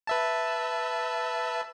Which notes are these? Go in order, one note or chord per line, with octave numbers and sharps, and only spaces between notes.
B4 E5 A5